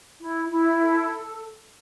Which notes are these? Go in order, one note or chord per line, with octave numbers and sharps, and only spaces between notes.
E4
E4
A4